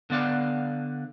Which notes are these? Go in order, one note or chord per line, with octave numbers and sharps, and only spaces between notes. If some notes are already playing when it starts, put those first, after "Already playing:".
D3 B3 D5 F5 F#5